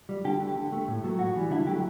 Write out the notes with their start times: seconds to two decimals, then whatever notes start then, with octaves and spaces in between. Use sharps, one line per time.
0.09 G3
0.25 D3 G4
0.40 A3
0.56 D3
0.72 A3
0.88 A2
1.04 F#3 A3
1.19 A2 F#4
1.36 E3 G3
1.50 D3 E4
1.67 F#3 A3 G4